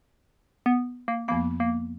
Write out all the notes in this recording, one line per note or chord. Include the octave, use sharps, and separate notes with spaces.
B3
A#3
F2 F3 A#3 B3
A#3